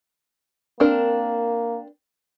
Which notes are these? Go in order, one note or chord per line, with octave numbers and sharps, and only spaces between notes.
A#3 C4 D4 A#4